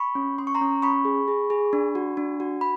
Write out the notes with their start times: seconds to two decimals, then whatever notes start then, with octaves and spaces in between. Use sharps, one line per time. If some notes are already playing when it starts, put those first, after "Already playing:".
Already playing: B5 C#6
0.15 C#4
0.38 C#4 C6
0.47 C#6
0.55 A#5 C6
0.61 C#4
0.82 C#4 B5 C#6
1.05 G#4
1.28 G#4
1.50 G#4
1.73 D4
1.95 F#4
2.17 D4
2.40 F#4
2.61 B5